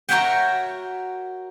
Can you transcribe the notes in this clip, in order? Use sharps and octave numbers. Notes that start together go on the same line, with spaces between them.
F#4 A#4 C#5 E5 F#5 G5